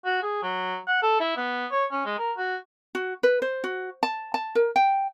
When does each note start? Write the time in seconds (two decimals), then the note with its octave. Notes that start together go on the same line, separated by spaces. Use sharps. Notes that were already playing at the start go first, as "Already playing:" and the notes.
0.05 F#4
0.23 G#4
0.43 F#3
0.88 F#5
1.02 A4
1.20 E4
1.37 B3
1.72 C#5
1.92 C#4
2.05 G#3
2.19 A#4
2.37 F#4
2.95 F#4
3.23 B4
3.42 C5
3.64 F#4
4.03 A5
4.34 A5
4.55 A#4
4.76 G5